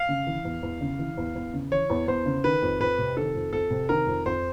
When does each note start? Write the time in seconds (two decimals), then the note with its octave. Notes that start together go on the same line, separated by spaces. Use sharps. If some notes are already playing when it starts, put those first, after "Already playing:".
Already playing: F5
0.09 C#3
0.27 E3
0.45 E2
0.63 E2
0.81 C#3
0.99 E3
1.17 E2
1.35 E2
1.53 C#3
1.71 E3 C#5
1.90 E2
2.08 E2 C5
2.26 C#3
2.44 D#3 B4
2.62 F2
2.80 F2 B4
2.98 C3
3.17 D#3 A4
3.35 F2
3.53 F2 A4
3.70 C3
3.89 D#3 A#4
4.07 F2
4.25 F2 C5